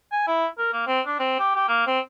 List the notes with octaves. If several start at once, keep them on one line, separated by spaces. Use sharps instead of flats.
G#5
E4
A#4
A#3
C4
D4
C4
G4
G4
A#3
C4